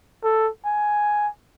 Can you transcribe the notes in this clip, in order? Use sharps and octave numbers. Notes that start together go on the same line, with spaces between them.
A4
G#5